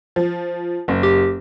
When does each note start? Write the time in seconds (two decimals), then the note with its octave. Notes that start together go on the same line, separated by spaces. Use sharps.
0.16 F3
0.88 F#1
1.03 G4